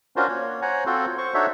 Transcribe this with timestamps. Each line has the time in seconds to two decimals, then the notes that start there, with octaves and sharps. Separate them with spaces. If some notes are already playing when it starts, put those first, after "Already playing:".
0.16 C#4 D4 F4 F#4 A#4 C5
0.28 A#3 C#5
0.62 C5 C#5 F#5 G#5 A#5
0.86 C4 F4 F#4 A4 C5
1.18 C5 C#6
1.34 D4 D#4 F#4 A4 C#5 E5